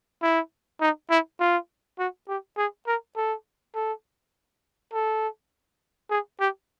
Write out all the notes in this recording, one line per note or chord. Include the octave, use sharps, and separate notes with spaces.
E4
D#4
E4
F4
F#4
G4
G#4
A#4
A4
A4
A4
G#4
G4